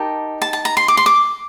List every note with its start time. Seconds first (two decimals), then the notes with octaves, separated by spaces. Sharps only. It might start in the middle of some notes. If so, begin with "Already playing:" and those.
Already playing: D#4 G4 A#4 A5
0.42 A5
0.53 A5
0.65 A#5
0.77 C6
0.88 D6
0.97 C6
1.06 D6